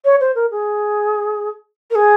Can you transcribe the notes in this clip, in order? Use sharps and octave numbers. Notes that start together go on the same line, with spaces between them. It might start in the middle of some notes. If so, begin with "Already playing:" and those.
C#5
C5
A#4
G#4
A#4
G#4